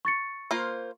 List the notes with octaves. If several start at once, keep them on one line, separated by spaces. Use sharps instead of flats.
C#6 A6 C#7
A#3 F4 C5